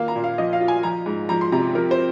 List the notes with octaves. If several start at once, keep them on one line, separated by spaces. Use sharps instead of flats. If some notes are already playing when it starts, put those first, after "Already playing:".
Already playing: D#3 A#3 F4 F5
A#5
A#2
F5
F3 D#5
F5
F4
G#5
F3 A#5
G#2
F3 A#5
C6
C3 A#5
F3 A#4
C5